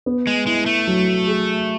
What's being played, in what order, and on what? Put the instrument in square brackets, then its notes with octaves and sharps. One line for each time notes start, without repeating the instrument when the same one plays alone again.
[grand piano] B3
[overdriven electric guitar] G#3
[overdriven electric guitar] G#3 [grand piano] E4
[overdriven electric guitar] A3
[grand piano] F#3
G#4